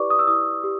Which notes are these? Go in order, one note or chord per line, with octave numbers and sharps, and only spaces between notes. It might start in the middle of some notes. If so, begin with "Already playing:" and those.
Already playing: E4 G4 B4 D5 C#6 D6
D#6
E6
E4 D#6
G4